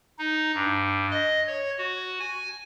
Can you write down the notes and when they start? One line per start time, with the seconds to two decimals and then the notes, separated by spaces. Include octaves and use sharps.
0.18 D#4
0.54 G2
1.11 D#5
1.47 C#5
1.78 F#4
2.20 G#5